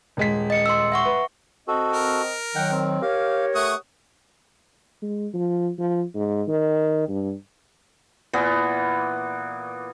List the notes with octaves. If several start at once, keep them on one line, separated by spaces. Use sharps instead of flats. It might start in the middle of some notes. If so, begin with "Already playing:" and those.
D#1 G#3 B6
D#5 C#7
C6 E6
E5 F#5 C#6
B4
C4 F#4 A4 D#5
A#4
D#3 F#3 F#5 G5
C4
G4 A#4 C#5 F5
A3 F#5 C#6 D#6
G#3
F3
F3
G#2
D#3
G2
A#2 E3 B3